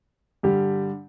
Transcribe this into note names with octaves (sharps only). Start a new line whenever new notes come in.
G2 D3 G3 G4